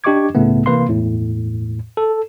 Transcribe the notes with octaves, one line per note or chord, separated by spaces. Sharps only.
D4 G4 D#5 C#6 D6 G#6
C#2 A2 C#3 A3 B3
C3 E3 A#3 B4 F5 C6
E2 A2
A4